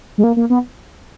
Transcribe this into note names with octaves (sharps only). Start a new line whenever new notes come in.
G#3
A#3
A#3
B3